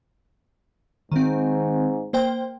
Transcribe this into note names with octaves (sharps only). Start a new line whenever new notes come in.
G#2 D#3 C4
A#3 C5 G5